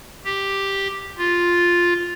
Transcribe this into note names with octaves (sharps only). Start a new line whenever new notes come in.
G4
F4